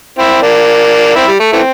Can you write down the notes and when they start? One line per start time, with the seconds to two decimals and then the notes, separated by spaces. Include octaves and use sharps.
0.19 C4 E4
0.42 A#3 D4
1.15 C4 E4
1.28 G3
1.40 A3
1.53 E3 A3 C4